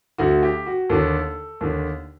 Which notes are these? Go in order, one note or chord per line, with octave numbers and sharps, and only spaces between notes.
D2 D3 F#4
G4
F#4
D#2 D3 A4
D#2 D3